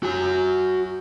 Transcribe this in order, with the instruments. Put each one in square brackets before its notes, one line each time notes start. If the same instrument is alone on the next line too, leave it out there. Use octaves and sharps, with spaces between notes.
[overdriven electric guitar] F#4 G#5